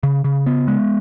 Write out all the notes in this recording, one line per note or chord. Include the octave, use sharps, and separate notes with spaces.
C#3
C#3
B3
G#3